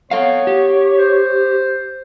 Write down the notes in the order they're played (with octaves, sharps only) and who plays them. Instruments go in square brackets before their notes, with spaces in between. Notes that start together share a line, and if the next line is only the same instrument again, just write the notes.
[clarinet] B3 [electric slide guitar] A4 F5 [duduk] C#5
[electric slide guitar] G4
[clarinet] C5